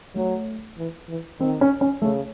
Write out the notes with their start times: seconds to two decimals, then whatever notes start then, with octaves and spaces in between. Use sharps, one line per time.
0.15 F#3 A3
0.77 E3
1.09 E3
1.40 D#3 C4
1.61 C#4
1.81 C#4
2.02 C#3 A3